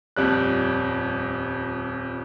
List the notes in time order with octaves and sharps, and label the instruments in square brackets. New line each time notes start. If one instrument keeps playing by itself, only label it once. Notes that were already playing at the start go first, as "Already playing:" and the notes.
[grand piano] D#1 F2 G3 F#6